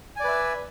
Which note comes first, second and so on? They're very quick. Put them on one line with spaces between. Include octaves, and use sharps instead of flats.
G#5 D5 B4 E5